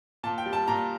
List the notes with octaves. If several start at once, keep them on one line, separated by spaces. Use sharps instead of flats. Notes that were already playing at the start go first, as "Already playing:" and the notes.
A#2 A5
G5
G3
A5
A#2 A#5